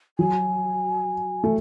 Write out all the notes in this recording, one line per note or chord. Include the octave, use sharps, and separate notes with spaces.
F#3 G#5
A3